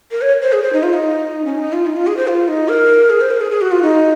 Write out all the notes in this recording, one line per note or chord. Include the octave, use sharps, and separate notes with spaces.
A#4
C#5
C5
G#4
C5
D#4
F4
D#4
C#4
D#4
F4
D#4
F4
G#4
C5
F4
D#4
A#4
G#4
C5
A#4
G#4
G#4
F#4
F4
D#4